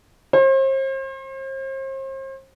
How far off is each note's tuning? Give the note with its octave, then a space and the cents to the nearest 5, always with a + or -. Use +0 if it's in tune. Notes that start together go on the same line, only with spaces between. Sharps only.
C5 +40